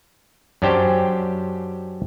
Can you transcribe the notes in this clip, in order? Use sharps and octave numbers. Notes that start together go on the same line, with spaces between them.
F#2 C#4 D4 G4 C5 G5